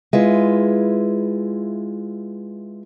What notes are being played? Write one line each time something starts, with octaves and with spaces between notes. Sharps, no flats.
G#3 E4 F4 B4